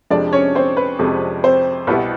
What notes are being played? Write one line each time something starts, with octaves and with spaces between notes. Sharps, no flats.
F2 C3 F3 G#3 D4 D5
C#4 C#5
C4 C5
B4
F2 C3 F3 G#3
C4 C5
C2 B2 G3 B3 E4 B4